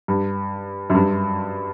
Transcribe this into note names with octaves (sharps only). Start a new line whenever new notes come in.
G2
F#2
G2